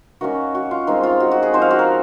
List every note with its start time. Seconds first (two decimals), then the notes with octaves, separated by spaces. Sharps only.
0.21 D#3 A#3 C#4 F#4
0.55 F#4
0.71 F4
0.87 D#3 G#3 C4 D#4
1.03 F4
1.20 F#4
1.31 F#4
1.43 G#4
1.53 F3 C4 D#4 C5
1.62 F5
1.71 F#4
1.79 A#4